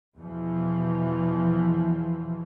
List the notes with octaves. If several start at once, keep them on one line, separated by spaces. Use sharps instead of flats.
E2 B2 E3 F3